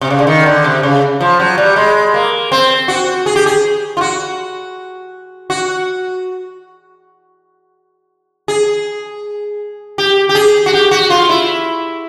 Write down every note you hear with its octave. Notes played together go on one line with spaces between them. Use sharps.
C3
C#3
D3
D#3
D3
C3
C#3
F3
F#3
G3
G#3
A#3
C4
F#4
G#4
G4
G#4
F4
F#4
F#4
G#4
G4
G4
G#4
F#4
G4
F#4
F4
E4